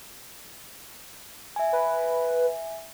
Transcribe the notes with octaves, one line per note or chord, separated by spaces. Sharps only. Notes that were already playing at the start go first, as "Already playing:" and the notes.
E5 G#5
B4